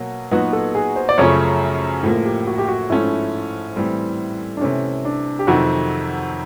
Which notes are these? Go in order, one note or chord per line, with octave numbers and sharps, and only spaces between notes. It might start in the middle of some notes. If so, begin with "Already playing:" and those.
Already playing: B2 F#3 A#3 C#5
A#2 F#3 B3 D#4 F#4 B4
A4
G#4
C5
D5
F#2 C#3 F3 A3 C#4 C#5
A2 F3 A#3 G#4
G4
F#4
G4
F#4
G#2 F3 A3 C#4 E4
A2 E3 G3 C4
D4
C3 E3 A3 C#4
D4
G4
F2 C3 D#3 F#3 F#4